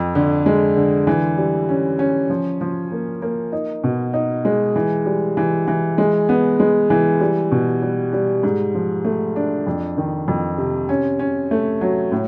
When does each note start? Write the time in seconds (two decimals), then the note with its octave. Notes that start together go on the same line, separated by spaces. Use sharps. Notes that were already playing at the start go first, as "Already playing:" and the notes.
Already playing: F2
0.15 D3
0.46 G#3
0.77 D3
1.07 E3
1.38 G3
1.69 C#4
1.99 C#4
2.30 F3
2.61 F3
2.92 A#3
3.22 A#3
3.52 D#4
3.84 B2
4.14 D#4
4.45 G#3
4.76 E3
5.06 G3
5.37 E3
5.67 E3
5.98 G#3
6.29 B3
6.59 G#3
6.90 E3
7.21 G3
7.51 B2
7.82 G3
8.13 G3
8.43 G#2
8.74 F3
9.04 A3
9.36 D4
9.67 F2
9.97 D#3
10.28 F2
10.58 C3
10.89 C#4
11.19 C#4
11.51 A3
11.81 F#3
12.12 A2